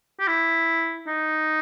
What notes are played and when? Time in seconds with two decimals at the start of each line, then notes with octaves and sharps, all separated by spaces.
0.20 G4
0.28 E4
1.07 D#4